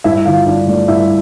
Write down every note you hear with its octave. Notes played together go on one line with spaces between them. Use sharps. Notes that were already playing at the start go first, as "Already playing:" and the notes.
G2 E4 E5
D3 F4 F5
G1 D4 D5
A3 D4 D5
G2 E4 E5